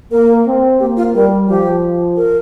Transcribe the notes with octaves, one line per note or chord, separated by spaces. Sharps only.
A#3 A#4
C4
A#3 G4
F4
G3 A#4
F3 G4
A#4